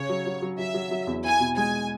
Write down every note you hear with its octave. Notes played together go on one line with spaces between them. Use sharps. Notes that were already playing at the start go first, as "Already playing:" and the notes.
Already playing: C#3 C#5
F#3
F#3
F#3
F#3 E5
F#3
F#3
E2
E4 G#5
B2
G#3 G#5